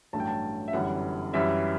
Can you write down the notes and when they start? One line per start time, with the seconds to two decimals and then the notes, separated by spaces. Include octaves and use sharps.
0.13 A1 G2 F#3 A3 A5
0.20 G5
0.27 A5
0.68 E5
0.73 G1 F#2 E3 G3 F#5
1.33 F#2 E3 G3 E5